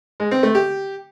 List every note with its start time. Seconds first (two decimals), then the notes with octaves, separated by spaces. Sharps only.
0.20 G#3
0.31 C4
0.43 A3
0.55 G4